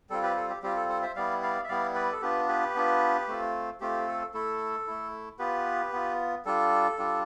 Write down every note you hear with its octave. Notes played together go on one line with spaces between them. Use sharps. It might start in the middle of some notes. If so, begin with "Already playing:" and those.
G3 C4 F4 A4
G4 B4
A4
G4
G3 C4 F4 G4
A4
A4 C5
C5 E5
G3 B3 E4 D5 F5
D5 F5
E5
G3 B3 E4 D5 F5
B4 D5
A4
B3 D4 F4 G4 B4
G4 B4
B3 D4 F4
A3 C4 F4
A3 C4 F4 G4
A4
A3 E4 A4
A3 E4
B3 F4 G4 B4
B3 F4
G3 D4 F4 A4
G3 D4 F4